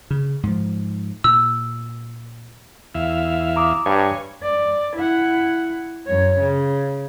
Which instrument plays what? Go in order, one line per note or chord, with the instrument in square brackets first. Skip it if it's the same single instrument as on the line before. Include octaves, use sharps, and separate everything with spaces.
[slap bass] C#3
G#2 F3
[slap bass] A#2 [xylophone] E6
[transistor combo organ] E2 E5 F5
[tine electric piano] A#5 D6 D#6
[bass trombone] G2 [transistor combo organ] C#5 G#5
[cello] D5
E4 F#5
F#2 C#5
C#3